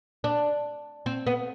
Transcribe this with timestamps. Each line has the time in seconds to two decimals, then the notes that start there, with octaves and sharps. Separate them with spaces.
0.24 D4
1.06 C4
1.27 B3